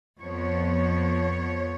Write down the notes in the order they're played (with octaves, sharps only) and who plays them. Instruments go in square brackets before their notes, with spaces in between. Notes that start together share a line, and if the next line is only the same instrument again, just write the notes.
[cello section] F2 F3 B3 C#5